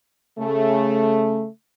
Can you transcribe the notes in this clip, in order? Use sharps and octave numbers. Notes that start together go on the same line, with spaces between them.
C#3 A3